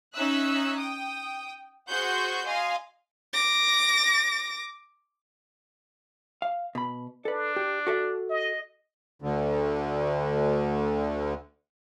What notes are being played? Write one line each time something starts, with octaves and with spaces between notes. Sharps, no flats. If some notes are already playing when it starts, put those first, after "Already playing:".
C#4 D#4 E5 E6 F#6
G5 D#6
F#4 G#4 C5 F#5 C#6 G6
D#5 F5 G#5 C6
D6 A#6
F5
B2 B5
D4 A4 B4
G4
F#4 A4 E5
D#5
D2 D3